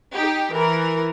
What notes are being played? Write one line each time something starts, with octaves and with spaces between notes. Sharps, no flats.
D#4 G4
E3 A#4